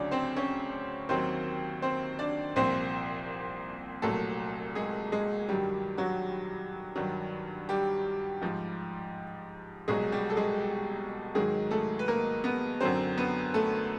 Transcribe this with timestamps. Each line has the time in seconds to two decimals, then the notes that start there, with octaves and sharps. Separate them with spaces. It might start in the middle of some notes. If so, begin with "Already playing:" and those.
Already playing: D2 C#3 F#3 C#4 D4 D5
0.11 C4 C5
0.36 C#4 C#5
1.09 D#2 D#3 F#3 C4 C5
1.82 C4 C5
2.19 D4 D5
2.56 C2 A#2 F3 C4 C5
4.02 C2 A#2 F#3 A3 A4
4.75 G#3 G#4
5.12 G#3 G#4
5.48 G2 D#3 F#3 G3 G4
5.97 F#3 F#4
6.96 G2 D#3 F#3
7.69 G3 G4
8.42 G#2 F3
9.88 C2 B2 F#3 G#3 G#4
10.12 G3 G4
10.30 A4
10.36 G#3 G#4
11.35 G#2 D#3 F#3 G#3 G#4
11.71 A3 A4
11.99 B4
12.08 A#3 A#4
12.44 B3 B4
12.81 F#2 D3 F#3 C4 C5
13.18 B3 B4
13.54 A3 A4